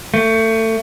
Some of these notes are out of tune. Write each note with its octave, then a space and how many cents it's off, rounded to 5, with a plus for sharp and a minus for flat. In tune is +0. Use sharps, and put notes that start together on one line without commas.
A3 +25